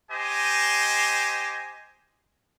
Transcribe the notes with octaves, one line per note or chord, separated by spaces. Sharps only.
G4 C5 D#5 G#5